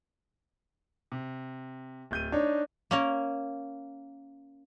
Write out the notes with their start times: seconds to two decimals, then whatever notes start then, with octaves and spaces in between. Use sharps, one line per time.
1.12 C3
2.11 D1 G6 D#7
2.32 D4 D#4 C#5
2.91 A#3 C#4 A#4